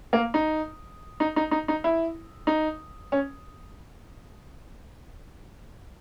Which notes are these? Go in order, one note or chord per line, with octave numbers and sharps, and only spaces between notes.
A#3
D#4
D#4
D#4
D#4
D#4
E4
D#4
C#4